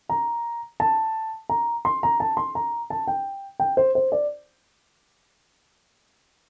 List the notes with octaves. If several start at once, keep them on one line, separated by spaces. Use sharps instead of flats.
A#5
A5
A#5
C6
A#5
A5
C6
A#5
A5
G5
G5
C5
C5
D5